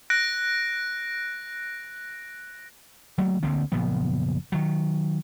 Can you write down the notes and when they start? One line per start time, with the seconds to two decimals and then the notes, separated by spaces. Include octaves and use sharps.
0.10 F#6 A#6 D7
3.18 F#3 A3 A#3
3.43 D2 D3 A#3 C4
3.72 F#1 A#2 F3 B3
4.52 D#3 F#3